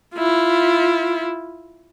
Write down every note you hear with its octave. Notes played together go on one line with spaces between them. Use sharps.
E4 F4